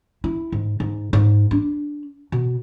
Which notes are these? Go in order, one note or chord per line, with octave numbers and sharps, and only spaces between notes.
E4
G#2
G#2
G#2
D4
B2